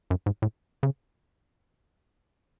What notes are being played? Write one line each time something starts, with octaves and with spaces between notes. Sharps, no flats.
F#2
G#2
A2
C#3